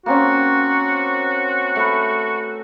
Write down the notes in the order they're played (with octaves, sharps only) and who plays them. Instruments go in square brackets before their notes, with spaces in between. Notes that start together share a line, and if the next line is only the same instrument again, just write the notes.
[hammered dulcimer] A#3 C4 C#4 [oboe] F#4
[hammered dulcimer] A3 B4